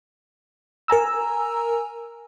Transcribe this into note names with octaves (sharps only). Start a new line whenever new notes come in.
A#4 G#5 A#5 E6